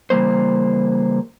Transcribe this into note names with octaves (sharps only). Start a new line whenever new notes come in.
C#3 E3 G3 A#3 C5